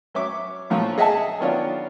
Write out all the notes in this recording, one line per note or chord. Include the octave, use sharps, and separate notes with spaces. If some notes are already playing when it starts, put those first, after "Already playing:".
F#3 C#4 E5 D6
A#2 F3 F#3 A3 F4
G#4 D#5 E5 F#5 G#5 A5
D#3 F#3 B3 C#4 D4 F4